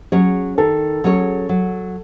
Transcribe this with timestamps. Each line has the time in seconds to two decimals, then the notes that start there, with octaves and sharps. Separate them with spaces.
0.12 F#3 C#4 G#4 C#5
0.58 D#3 A4
1.04 F#3 C#4 G#4 C#5
1.49 F#3